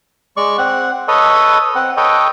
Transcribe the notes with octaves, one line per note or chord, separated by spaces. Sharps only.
G#3 D5 C#6
C4 F#5
A4 B4 C#5 D#5
C4 F#5
A4 B4 C#5 D#5 G5